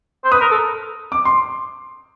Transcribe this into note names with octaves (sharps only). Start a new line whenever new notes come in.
C5
B4 D#6
A#4
A4
D6
C6